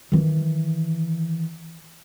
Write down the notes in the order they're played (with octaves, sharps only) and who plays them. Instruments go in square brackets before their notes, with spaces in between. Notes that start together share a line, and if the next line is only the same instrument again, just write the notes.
[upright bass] D#3 E3